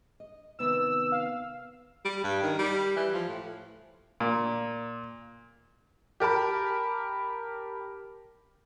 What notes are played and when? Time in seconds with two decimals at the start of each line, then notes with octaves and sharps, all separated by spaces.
0.20 D#5
0.59 C3 D#3 B3 E6
1.12 F5
2.05 G3
2.24 G2
2.42 D#3
2.59 G3
2.96 E3
3.14 F3
3.28 A2
4.20 A#2
6.20 G4 A#4 A5 B5